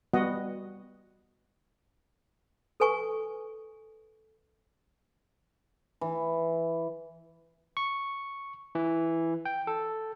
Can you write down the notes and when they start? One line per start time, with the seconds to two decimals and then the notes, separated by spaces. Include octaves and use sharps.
0.14 G3 B3 F#4 D#5 F#5
2.80 A4 B4 G#5 C#6
6.01 E3
7.77 C#6
8.75 E3
9.45 G5
9.67 A4